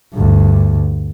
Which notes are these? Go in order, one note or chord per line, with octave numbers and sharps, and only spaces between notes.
D2 G2